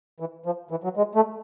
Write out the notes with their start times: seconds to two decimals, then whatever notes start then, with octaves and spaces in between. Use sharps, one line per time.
0.20 E3
0.46 F3
0.71 E3
0.84 F#3
0.97 G#3
1.15 A3